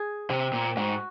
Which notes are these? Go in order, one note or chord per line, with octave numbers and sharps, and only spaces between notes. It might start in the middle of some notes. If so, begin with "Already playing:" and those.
Already playing: G#4
C3 C4
A#2
G#2 F#4